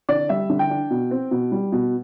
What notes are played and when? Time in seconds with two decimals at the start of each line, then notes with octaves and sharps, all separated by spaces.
0.08 D3 D5
0.29 G3 E5
0.49 D3
0.59 G5
0.70 D4
0.90 B2
1.11 C4
1.31 B2
1.52 G3
1.72 B2